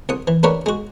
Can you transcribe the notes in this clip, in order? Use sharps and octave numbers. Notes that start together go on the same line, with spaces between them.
C2 F#5 D#6
E3
A3 D4 G4 A#4 B4 C#5
G#3 F#4